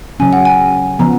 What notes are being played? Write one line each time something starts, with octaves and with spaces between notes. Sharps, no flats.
C#3 F#3 C#4 G#5
F#5
G#5
C#3 F3 B3 A#5